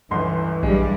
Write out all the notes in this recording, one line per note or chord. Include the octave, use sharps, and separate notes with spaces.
G1 C#2 E3 C6
A#1 G2 G3 G#3